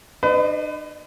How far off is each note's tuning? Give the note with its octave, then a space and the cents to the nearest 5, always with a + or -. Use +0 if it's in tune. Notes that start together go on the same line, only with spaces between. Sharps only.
D4 +45 B4 +35 D#5 +0